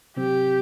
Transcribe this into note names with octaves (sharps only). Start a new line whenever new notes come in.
C3 F#3 C4 G4